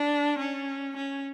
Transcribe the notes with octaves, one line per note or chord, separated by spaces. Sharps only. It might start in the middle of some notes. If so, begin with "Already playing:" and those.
Already playing: D4
C#4
C#4